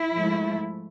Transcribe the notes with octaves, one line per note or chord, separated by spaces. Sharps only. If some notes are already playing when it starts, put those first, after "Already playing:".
Already playing: E4
G#2 F3 A3